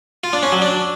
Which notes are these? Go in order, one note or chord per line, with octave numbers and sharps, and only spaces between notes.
F4
D4
C#4
F#3
D4